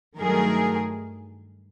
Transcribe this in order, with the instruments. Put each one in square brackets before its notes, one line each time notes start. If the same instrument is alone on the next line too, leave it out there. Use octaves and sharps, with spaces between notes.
[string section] G2 D#3 F#3 A3 G#4 A#4